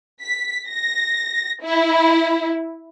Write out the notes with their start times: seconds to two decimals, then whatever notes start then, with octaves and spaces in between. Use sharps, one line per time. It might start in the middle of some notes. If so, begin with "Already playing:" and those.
0.21 B6
0.68 A#6
1.63 E4